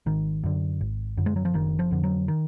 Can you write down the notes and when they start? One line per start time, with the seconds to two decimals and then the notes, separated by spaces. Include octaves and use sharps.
0.06 G#1 D#3
0.44 F#2 D3
0.81 G#1
1.17 F#2 D3
1.26 G#3
1.36 F#3
1.45 F3
1.54 F#1 D#3
1.79 F3
1.91 F2 D3
2.03 F#3
2.28 D#3